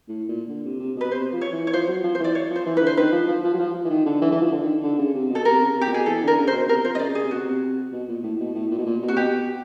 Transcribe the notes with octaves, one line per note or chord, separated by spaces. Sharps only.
A2
A#2
D3
C3
C3
B2 B4
C3 C5
F3
C#5
E3
C#5
F3 C5
F#3
F3
C5
E3 D5
C#5
F3
C5
E3
B4
D3
C5
D#3 B4
F3
F3
F3
F#3
F3
E3
D#3
D3
E3
E3
F3
D3
D#3
D3
C#3
C3
B2
A4
C3 A#4
C#3
C3
G4
A#2
B2 G#4
E3 A4
D3 A#4
C#3
C5
B2
C3 A#4
F3 C5
C3 D#5
C#3 D5
C#3 G#4
C3
B2 F#4
C3
B2
A#2
A2
B2
A2
A#2
B2
A#2
B2
C3 F#4
B2 G4